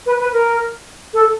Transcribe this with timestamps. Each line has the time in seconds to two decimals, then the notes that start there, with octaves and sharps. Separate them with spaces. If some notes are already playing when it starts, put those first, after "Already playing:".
0.06 B4
0.20 B4
0.32 A#4
1.13 A4